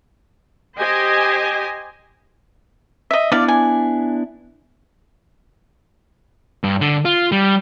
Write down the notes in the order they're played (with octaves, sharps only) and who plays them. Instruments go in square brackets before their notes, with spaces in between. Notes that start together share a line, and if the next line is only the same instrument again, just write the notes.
[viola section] G4 C5 D#5 G#5
[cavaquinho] D#5 E5
[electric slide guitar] B3 D4 E4 [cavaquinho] D5 F5
[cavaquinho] G#5
[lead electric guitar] G2
D3
F4
G3